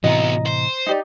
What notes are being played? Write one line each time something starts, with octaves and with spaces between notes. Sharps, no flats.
A2 C3 E3 F#3 B3 D#5 A#5
C5
D#4 G4 D5